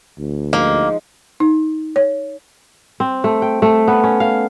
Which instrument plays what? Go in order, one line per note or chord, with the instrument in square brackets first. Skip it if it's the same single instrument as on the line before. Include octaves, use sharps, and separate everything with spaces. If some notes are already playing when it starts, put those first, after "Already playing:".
[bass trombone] D2
[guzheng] F3 G#3 D#4 [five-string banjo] A#3
[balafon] D#4
C#5
[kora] C4
A3
G5
A3
B3
C#4
F5